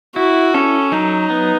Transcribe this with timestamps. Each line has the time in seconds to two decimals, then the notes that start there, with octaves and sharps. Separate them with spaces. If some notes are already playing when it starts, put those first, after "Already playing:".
0.16 E4 F#4
0.54 C#4 A4
0.92 F#3 D#4
1.30 B3